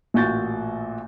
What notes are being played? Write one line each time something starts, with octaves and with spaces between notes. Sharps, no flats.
A1 A#2 F#4 G6 A6